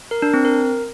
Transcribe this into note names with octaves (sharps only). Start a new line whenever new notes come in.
A#4
D4
C4
A#4